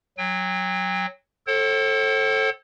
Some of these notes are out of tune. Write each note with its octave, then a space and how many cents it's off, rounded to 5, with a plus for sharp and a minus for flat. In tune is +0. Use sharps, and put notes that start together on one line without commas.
F#3 +0 G5 +35
A4 +0 C5 +45 G5 -45